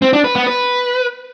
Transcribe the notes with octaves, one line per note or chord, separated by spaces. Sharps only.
C4
D4
B4
B3
B4